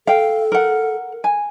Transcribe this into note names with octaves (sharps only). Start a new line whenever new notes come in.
A4 F5 G5
A#4 F#5
G#5